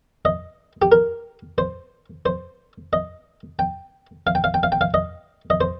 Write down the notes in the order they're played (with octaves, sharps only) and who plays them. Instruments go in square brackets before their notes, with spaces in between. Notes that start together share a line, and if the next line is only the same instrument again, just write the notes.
[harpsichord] D#5
G4
A#4
C5
C5
D#5
G5
F5
G5
F5
G5
F5
G5
F5
D#5
D#5
C5